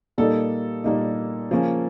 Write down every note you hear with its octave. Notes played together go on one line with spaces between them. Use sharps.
A#2 G3 A#3 D#4 A4
A#2 G3 A#3 D#4
C#3 F3 A#3 C#4